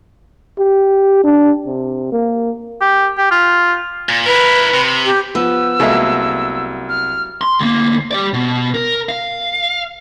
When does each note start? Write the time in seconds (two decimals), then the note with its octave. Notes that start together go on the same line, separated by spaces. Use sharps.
0.59 G4
1.24 D4
1.66 C3
2.12 A#3
2.81 G4
3.18 G4
3.31 F4
4.09 A#2
4.26 E4 A#4 B4
4.74 C3
5.05 G4
5.35 F3 B3 E6
5.80 C2 F#3 G#3 A#3 A4 E5
6.89 F6
7.41 C6
7.59 D2 A#3
8.11 G4 D5
8.33 B2
8.75 A#4
9.09 F5